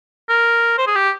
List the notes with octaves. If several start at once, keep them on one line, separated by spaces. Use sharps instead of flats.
A#4
C5
G#4
G4